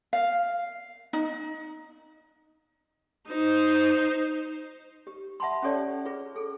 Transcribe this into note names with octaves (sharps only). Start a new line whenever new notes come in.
F5
D#4
D#4 C5
G4
E5 F#5 A5 B5 C6
C#4 G4 A4 C#5 D5 A5
F4 G#4 B4
G#4 A4